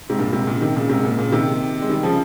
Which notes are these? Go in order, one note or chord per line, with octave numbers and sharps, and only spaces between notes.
G#2 C3
G2 A#2
G#2 C3
A#2 C#3
C3 D#3
A#2 C#3
G#2 C3
A#2 C#3
A#2 C#3
C3 D#3
G#3
D#3 G3
C#3 F3